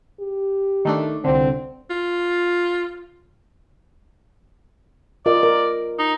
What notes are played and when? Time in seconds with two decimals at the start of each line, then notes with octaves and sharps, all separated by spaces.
0.20 G4
0.85 D#3 A3 D4
1.24 C2 D3 C4
1.90 F4
5.26 F4 A#4 D5 D#5
5.43 A#4
5.99 D#4